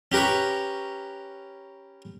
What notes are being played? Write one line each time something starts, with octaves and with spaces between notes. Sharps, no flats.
C#4 G4 A#4 B4 C#6